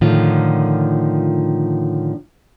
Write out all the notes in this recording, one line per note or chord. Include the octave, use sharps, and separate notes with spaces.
A2 D3 D#3 F3 F4